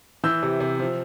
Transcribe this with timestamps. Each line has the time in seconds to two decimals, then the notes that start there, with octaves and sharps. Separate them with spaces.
0.24 E3 E6 G6
0.43 C3
0.60 C3
0.79 F3